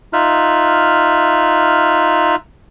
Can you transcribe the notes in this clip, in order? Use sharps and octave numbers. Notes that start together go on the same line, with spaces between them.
D#4 F4 E5 F6 F#6